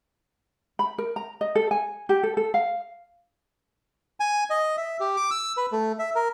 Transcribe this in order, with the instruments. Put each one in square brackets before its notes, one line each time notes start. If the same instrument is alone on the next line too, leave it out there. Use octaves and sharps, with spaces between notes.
[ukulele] B5
A#4
A#5
D#5
A4
G#5
G4
A4
A4
F5
[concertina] G#5
D#5
E5
G4
D6
E6
B4
A3
E5
A#4